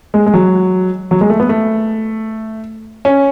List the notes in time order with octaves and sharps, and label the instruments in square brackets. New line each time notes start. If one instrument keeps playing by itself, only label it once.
[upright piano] G#3
G#3
F#3
F#3
G#3
A3
B3
A3
C#4